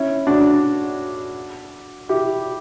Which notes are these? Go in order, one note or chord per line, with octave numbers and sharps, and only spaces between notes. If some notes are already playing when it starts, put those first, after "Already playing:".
Already playing: C#4 E4
D4 F#4
E4 G4